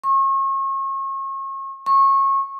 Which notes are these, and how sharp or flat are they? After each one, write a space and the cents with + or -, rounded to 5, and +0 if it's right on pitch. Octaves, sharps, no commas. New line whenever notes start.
C#6 -35
C#6 -25